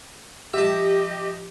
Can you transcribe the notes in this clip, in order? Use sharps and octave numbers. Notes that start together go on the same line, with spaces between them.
F3 G4 D#5 E5 A5